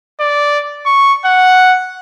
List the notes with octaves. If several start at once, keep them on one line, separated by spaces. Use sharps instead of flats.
D5
C#6
F#5